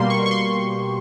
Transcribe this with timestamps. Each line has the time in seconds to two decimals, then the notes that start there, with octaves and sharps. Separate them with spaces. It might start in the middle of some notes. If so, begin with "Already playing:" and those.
Already playing: B2 G3 A#3 C6
0.10 C#6
0.26 C#6
0.31 C6